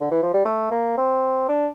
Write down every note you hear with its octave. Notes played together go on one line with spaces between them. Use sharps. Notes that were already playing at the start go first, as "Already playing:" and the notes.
D3
E3
F3
G3
A3
A#3
C4
D4